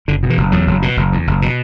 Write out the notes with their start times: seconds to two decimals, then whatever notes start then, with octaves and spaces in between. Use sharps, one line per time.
0.08 F#1 D3
0.23 B2
0.30 E3
0.37 F#1
0.52 E2 F#3
0.67 F#1
0.82 B2
0.97 F#1
1.12 E2
1.27 F#1
1.42 B2